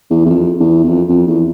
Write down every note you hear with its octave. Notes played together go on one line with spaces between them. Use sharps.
E2
E2
F2
E2
E2
F2
F2
E2